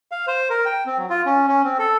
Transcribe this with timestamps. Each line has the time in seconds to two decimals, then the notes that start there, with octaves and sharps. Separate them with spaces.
0.12 F5
0.27 C5
0.50 A#4
0.65 G5
0.86 C4
0.98 F#3
1.10 F4
1.26 C#4
1.48 C#4
1.64 C4
1.79 A4